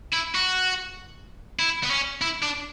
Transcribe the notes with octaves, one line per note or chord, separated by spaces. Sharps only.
E4
F#4
E4
B3
C#4
E4
D4